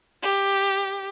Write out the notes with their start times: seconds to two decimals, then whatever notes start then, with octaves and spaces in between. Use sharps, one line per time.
0.23 G4